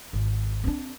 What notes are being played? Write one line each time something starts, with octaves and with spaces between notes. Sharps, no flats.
G#1
C4 D4